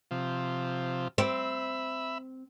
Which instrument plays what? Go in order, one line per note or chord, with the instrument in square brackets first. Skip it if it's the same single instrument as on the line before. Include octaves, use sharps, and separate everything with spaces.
[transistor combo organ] C3 F3
[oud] C4 [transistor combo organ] E5 B5